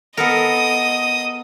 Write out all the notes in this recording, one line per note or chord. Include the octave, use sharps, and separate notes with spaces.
B3 A4 A#4 D#5 D#6